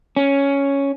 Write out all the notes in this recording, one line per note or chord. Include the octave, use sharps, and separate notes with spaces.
C#4